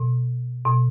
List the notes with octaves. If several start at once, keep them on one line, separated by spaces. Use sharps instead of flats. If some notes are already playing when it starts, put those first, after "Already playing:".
Already playing: B2
B2